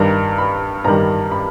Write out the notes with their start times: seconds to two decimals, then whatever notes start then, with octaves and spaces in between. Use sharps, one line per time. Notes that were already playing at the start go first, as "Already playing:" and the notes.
Already playing: G2 D#3 G3 A#5
0.38 B5
0.84 G2 D#3 G3 A#5
1.32 B5